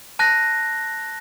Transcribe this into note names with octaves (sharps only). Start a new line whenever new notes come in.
A5 F#6 A#6